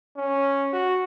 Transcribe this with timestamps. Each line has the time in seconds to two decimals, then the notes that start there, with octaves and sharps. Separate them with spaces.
0.17 C#4
0.73 F#4